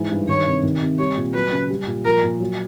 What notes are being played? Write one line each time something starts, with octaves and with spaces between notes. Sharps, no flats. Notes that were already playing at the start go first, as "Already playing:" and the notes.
Already playing: G#2 E3
G2
D#3 C#5
C3
D#3
C3
G3 C#5
A#2
F#3 B4
C#3
G3
A#2
F3 A#4
A#2
F#3